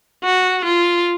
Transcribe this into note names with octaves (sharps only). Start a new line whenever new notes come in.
F#4
F4